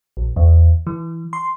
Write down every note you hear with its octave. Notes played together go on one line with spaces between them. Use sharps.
A#1
E2
E3
C6